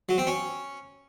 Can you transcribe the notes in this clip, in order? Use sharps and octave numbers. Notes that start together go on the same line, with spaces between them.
F#3
C4
C#4